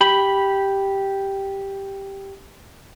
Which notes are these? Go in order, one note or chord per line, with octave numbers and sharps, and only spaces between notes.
G4 B5